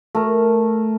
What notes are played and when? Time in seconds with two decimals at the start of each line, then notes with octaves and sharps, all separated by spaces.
0.15 A3 A#4